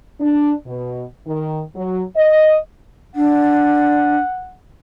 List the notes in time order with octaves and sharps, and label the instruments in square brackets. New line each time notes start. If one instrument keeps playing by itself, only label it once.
[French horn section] D4
B2
D#3
F#3
D#5
[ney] D4 [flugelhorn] F#5